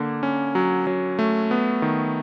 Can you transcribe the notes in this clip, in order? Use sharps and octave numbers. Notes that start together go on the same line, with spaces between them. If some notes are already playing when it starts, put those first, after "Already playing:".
Already playing: D3 A#3
C#4
F#3
F#3
A3
B3
D#3